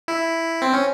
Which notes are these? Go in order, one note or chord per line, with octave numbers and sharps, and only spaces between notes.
E4
C4
C#4